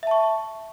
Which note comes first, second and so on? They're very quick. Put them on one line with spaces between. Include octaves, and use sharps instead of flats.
E5 A5 C#6